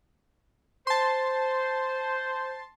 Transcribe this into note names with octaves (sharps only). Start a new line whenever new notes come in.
C5 A5 C6